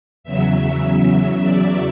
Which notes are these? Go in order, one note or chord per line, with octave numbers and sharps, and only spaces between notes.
E2 C#3 F#3 E5
D5